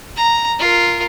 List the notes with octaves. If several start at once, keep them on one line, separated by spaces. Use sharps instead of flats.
A#5
F4 A#4